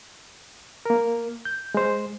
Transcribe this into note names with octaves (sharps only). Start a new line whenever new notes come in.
A#3 A#4
G6
G#3 C5